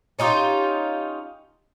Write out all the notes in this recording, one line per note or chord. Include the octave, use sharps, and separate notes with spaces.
C#4 D#4 F4 G4